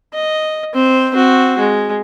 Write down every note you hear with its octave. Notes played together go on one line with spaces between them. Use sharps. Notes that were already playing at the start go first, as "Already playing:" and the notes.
D#5
C4 C5
C4 F#4
G#3